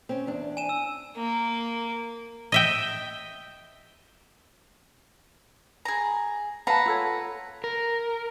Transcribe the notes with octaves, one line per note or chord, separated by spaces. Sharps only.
C4 C#4
E2 D4
G#5 D#7 E7
E6
A#3
D#5 E5 G5
G#4 A#5
B4 F5 F#5 A5 A#5
F4 A4 C#5
A#4